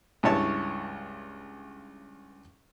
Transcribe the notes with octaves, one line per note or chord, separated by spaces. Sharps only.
C#2 G2 E4 C#5 A5 C#6